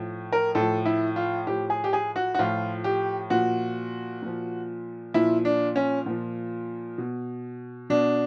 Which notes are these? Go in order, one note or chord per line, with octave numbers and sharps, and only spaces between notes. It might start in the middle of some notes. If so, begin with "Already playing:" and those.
Already playing: A2 F3
A#4
A2 F3 A4
E4
F4
A2 F3 G4
G#4
G4
G#4
F#4
F#4
A2 F3 F4
G4
A#2 F3 F#4
A#2 F3
A#2 F3 E4
D4
C#4
A#2 F3
B2
B2 D4